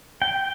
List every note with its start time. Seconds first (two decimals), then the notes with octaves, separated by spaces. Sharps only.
0.22 G5